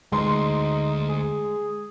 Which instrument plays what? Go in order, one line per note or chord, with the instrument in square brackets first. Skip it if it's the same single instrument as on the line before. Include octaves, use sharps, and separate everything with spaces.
[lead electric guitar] D2 [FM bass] G#3 [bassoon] D#4 [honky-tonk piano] C6
[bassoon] G#4